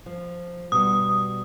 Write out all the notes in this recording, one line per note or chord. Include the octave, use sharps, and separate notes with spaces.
F3
B2 G3 D#6